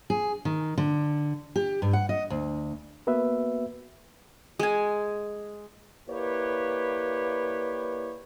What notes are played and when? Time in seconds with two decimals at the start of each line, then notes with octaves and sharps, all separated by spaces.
0.10 G#4
0.45 D#3
0.78 D3
1.56 G4
1.82 G2
1.93 F#5
2.09 D#5
2.30 D2
3.07 A#3 B3 F#4 B4 E5
4.59 G#3 G#5
6.09 A#3 E4 G4 B4 C#5 D5